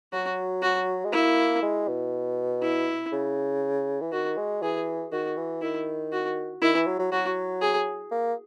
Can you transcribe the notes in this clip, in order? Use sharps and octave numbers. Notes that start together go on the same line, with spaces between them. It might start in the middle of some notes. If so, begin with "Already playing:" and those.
F#3 F#4
F#4
G#3
A#3 E4
G#3
B2
E4
C#3
E3
D#3 F#4
G#3
E3 G#4
D#3 F#4
E3
D#3 E4
F#4
D#3 E4
E3
F#3
F#3
F#3 F#4
G#4
A#3